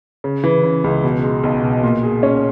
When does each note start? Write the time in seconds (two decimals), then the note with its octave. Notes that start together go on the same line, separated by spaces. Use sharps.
0.24 C#3
0.44 E3
0.63 C#3
0.84 C#2
1.04 B2
1.23 G#3
1.43 B1
1.63 B2
1.83 A#2
2.03 G#4
2.23 C#4